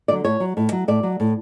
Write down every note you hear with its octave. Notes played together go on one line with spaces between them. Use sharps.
D3 F#3 D5
A2 C#5
F#3
A2
F#3
A2 D5
F#3
A2